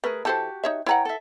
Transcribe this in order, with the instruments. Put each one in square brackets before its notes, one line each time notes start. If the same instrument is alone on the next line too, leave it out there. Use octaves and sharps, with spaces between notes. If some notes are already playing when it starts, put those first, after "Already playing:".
[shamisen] A3 [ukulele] G#4 A#4 B4
[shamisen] E3 A4 C5 [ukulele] F#4 G4 A5
[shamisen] D#4 C#5 E5
[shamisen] E4 B4 F#5 [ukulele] C#5 G5 A#5
[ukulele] A4 E5